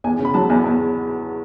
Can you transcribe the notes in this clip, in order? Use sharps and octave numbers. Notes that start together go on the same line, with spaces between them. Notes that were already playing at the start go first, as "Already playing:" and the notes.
E2 G#5
C#3
B5
F#3 A5
E2 G#5
E2